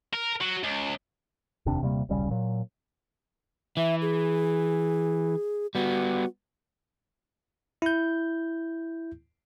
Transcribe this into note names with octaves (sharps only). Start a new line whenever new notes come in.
A#4
F#3
C#2
F1 D#2 C3 D4
D#1 C3 G3 A#3
D#1 B1 C#3 G3
A#2 F#3
E3 E5
G#4
G3 B3 F#4
E4 G6